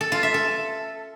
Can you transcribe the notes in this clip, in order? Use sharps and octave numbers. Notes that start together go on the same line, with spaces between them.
A4
F4
E5
A4